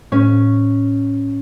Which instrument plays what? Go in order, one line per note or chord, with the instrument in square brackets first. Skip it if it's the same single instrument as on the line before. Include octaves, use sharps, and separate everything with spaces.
[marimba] A2 [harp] C#4